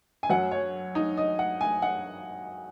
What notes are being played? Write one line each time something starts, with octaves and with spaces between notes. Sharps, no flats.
G#5
F#2 F#3 F#5
C#5
D#4
D#5
F#5
G#5
F#5